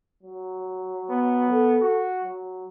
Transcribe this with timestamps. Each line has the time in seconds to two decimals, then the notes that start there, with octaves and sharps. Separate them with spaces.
0.23 F#3
1.10 B3
1.50 A4
1.81 F#4
2.23 F#3